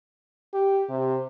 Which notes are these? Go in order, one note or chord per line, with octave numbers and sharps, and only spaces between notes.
G4
C3